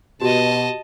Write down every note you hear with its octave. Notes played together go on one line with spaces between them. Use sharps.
B2 F#4 G4 D#5 A5 C6